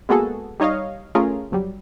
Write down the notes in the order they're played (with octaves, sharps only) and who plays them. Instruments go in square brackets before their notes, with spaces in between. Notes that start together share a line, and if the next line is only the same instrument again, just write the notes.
[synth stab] G#3 A#3 B3 F#4 G#4 A4
G3 D#4 C#5 D#5 F5
A3 C#4 F4 G#4 A#4
G1 F#3 G3